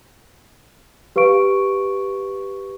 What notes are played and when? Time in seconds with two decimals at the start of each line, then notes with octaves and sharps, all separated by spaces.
1.16 G4 B4 F5 C#6 D7